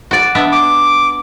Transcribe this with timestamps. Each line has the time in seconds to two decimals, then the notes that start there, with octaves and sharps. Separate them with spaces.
0.11 F#4 D5
0.35 B3 D4 E5
0.52 D6